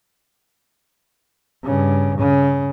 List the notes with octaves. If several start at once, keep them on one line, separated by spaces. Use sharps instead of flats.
G2 C#3
C#3